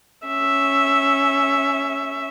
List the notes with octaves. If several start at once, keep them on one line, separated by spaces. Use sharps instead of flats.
C#4 E5